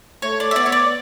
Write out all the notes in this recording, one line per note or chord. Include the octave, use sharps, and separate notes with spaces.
A3 C#5
D5
E5
B3 D5
C#5
D5